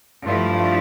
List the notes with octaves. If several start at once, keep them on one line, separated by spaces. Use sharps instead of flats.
G2 F3 A3 E4 F4